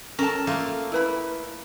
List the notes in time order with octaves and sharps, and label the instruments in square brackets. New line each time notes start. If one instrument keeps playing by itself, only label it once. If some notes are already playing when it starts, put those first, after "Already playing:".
[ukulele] C#4 A4 A5 [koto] A#4
[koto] A3 A#3 F4
[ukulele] E4 B4 B5